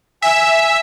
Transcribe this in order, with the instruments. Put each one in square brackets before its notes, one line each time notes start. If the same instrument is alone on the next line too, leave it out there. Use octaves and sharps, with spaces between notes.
[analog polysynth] E5 [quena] G#5